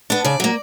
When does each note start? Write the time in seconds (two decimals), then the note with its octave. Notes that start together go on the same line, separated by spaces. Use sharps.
0.10 B3 D4
0.25 C#3 D5
0.40 F#3 A#3